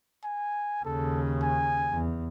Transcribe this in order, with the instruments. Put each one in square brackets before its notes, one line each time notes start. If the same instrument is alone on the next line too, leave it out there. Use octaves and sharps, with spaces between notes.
[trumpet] G#5
[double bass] D#2 C#3 [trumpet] A4
[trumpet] G#5
[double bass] E2